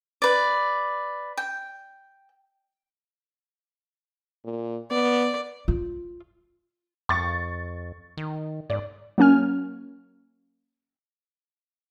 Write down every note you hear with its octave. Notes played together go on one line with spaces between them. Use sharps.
B4 D5
G5
A#2
B3 D5
F4
F2 C#6 A6
D#3
G#2 D5
F#3 A#3 C#4 G#5 F6